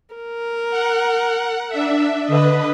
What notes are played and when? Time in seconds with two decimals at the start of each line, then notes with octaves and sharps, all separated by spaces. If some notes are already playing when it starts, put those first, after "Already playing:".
0.15 A#4
0.71 F#5
1.69 D4 E5
2.28 D3 B4 D#5